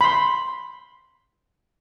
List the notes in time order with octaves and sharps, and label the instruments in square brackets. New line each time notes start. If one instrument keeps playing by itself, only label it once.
[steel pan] B5 C6